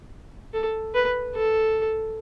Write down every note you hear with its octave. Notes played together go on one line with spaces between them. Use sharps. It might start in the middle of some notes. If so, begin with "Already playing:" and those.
A4
B4
A4